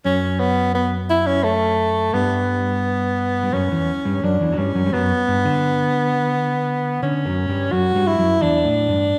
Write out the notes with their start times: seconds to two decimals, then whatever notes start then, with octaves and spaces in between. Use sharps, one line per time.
0.05 F#2 F#3 C#4
0.40 B3
0.75 B3
1.10 E4
1.27 C#4
1.44 A3
2.13 G2 G3 B3
3.43 G3
3.53 F#2 F#3 C#4
3.71 E2 E3
4.05 G2 G3
4.23 F#2 F#3 D4
4.40 E2 E3
4.52 F#3
4.58 G2 G3 C#4
4.75 F#2 F#3
4.86 G3
4.93 F#2 F#3 B3
5.28 G2
5.45 D3
7.03 D3 C#4
7.25 F#2 F#3
7.49 G2 G3
7.72 F#2 F#3 F#4
7.95 G2 G3
8.07 E4
8.19 F#2 F#3
8.41 E2 E3 D4
8.65 A2
8.88 G2